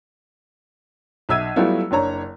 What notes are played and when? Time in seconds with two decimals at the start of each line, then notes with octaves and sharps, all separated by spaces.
1.29 B1 E5 E6 G#6 D#7
1.56 F#3 G3 A3 B3 E4 F4
1.91 F#1 D4 C#5 A#5